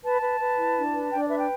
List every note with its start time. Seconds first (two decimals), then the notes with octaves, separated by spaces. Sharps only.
0.03 B4 A5
0.21 B4
0.40 B4
0.58 E4
0.75 D4
0.93 B4
1.12 D4 G5
1.20 D5
1.29 B4 E5
1.38 G5